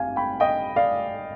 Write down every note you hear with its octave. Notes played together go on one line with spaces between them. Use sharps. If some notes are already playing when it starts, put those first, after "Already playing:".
Already playing: G#1 G2 F5 G#5
G5 B5
D#5 G5
D5 F5